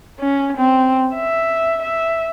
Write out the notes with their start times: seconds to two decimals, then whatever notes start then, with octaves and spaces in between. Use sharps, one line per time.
0.20 C#4
0.57 C4
1.15 E5
1.82 E5